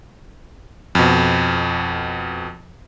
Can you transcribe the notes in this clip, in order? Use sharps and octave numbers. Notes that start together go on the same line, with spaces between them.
F2 B2